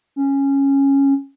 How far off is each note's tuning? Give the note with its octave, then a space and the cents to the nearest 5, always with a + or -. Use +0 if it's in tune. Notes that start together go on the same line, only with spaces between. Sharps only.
C#4 -10